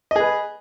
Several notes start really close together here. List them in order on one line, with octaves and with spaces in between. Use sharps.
D#5 G#4 B4